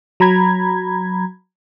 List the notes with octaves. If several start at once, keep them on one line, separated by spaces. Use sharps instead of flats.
F#3 A#5 B5 G#6